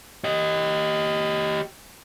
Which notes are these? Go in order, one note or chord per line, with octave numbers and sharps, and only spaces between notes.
G4 D#5